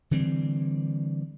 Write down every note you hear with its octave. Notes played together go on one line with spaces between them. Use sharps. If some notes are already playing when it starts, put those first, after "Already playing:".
D3 E3 G3 C4